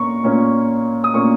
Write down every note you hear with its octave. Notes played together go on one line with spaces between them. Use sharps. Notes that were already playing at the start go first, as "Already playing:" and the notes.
Already playing: A#2 A#3 C#4 A#5 C#6
A#2 A#3 C#4
D#6
A#2 A#3 C#4 C#6